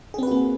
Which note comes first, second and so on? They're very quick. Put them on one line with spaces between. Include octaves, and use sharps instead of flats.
G#4 C4 B4 F#4 A#3